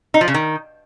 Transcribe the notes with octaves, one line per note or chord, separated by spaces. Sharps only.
D#4
F3
C#3
D#3